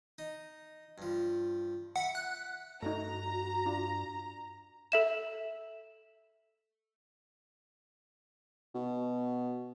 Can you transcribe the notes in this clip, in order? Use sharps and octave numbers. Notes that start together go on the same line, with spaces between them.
D#4
G2 F3
E5 F#5 B5
F#6
G2 A3 D#4 F#4 A#5
D4 F4
A4 E5 E7
B2